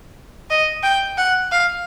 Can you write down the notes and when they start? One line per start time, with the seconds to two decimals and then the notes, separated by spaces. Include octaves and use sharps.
0.50 D#5
0.83 G5
1.17 F#5
1.52 F5